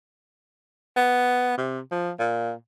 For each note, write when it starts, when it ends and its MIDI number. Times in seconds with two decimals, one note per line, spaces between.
0.96 1.55 59
1.58 1.80 48
1.91 2.12 53
2.19 2.53 46